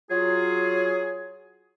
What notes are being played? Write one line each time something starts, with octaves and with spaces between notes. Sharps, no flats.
F#3 F4 G#4